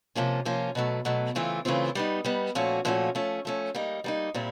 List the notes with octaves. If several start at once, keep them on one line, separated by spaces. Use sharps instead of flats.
C3 F3 A#3 C#4 F4
C3 F3 A#3 C#4 F4
B2 F#3 A3
B2 F#3 A3
C#3 E3 A3 C4 F4
C#3 E3 A3 C4 F4
G3 B3 D#4
G3 B3 D#4
A#2 F3 A3 C#4 F#4
A#2 F3 A3 C#4 F#4
F3 A3 C#4
F3 A3 C#4
G3 A#3 D#4
G3 A#3 D#4
A#2 G3 C4 E4